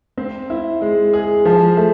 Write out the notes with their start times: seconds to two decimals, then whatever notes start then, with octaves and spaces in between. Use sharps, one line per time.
0.17 C4
0.50 E4
0.81 G#3
1.13 G#4
1.45 F3
1.77 A3